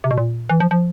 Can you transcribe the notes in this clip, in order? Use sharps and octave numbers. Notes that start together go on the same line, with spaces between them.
C3
B2
A#2
E3
F3
F3